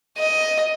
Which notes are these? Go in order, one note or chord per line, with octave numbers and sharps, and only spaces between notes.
D#5